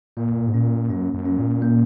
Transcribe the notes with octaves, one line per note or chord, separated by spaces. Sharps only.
A#2 A#3
G#2
A#2 C#4
F#2 C#4
F#2
C#4
A#2
A#3